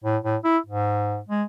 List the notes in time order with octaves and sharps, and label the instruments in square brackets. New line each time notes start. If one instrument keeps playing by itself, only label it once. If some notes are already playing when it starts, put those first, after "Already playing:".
[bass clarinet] A2
A2
E4
G#2
G#3